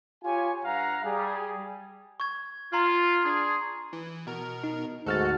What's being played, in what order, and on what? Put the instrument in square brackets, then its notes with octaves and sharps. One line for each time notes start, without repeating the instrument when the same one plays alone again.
[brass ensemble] F4 G4 C#5 G#5
G2 F5 F#5 A#5
G3 G#4
[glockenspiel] C#6 G#6
[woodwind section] F4 [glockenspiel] A#5 C6 G#6
[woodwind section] D4 G#4
[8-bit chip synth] E3
B2 A#4
[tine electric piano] D#4
[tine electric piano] D2 F6 A6 [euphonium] G#2 [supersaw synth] F#4 [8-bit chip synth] A4